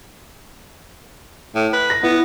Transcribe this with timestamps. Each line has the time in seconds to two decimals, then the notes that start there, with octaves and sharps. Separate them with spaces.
1.55 A2
1.73 B4
1.90 A#6
2.03 B3 E4